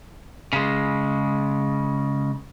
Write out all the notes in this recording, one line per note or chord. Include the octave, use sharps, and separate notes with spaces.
C#3 G#3